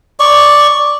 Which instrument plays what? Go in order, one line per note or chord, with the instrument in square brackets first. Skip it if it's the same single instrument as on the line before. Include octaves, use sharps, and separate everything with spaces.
[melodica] D5 C#6